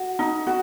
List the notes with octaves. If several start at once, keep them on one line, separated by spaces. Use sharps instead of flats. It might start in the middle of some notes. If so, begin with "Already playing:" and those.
Already playing: F#4
D#4
F#4